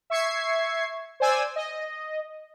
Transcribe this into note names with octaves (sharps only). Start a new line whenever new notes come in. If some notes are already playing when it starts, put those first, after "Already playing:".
E5 C#6 G#6 C7
C5 D5 G#5 E6
D#5